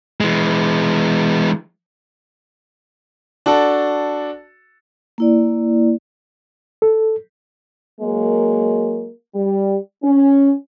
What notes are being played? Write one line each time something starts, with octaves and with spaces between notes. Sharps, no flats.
E3 G#3
D4 F#4 A4
A#3 E4 D5
A4
F#3 G#3 A#3
G3
C#4